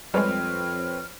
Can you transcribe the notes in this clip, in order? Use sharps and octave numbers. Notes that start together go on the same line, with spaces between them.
F2 G3 G#3 C4 B4 C#5 F6